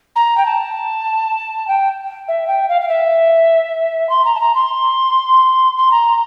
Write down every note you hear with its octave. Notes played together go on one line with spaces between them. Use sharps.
A#5
G5
A5
G5
E5
G5
F5
F5
E5
C6
A#5
A5
A#5
C6
C6
A#5